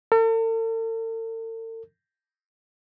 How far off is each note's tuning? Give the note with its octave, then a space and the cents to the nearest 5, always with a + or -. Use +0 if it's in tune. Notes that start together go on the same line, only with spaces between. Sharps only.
A4 +45